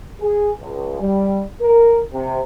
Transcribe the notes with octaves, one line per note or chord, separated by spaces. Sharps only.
G#4
C#2
G3
A#4
C3